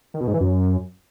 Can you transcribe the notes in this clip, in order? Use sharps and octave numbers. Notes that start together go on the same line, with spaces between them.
D#3
B2
G#2
E3
F#2